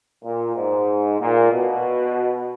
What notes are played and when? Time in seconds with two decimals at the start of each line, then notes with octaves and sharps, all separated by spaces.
0.24 A#2
0.56 G#2
1.20 A#2
1.52 B2